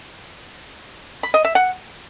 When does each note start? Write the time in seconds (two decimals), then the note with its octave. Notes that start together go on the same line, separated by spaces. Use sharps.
1.23 B5
1.34 D#5
1.45 E5
1.55 F#5